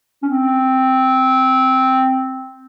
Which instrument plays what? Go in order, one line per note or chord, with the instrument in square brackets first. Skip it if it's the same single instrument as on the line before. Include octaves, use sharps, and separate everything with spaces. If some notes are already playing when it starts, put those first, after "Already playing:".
[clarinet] C#4
C4